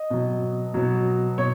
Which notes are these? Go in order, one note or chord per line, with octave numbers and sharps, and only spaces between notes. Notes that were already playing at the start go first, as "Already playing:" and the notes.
Already playing: D#5
B2 F#3
B2 F#3
B2 C#5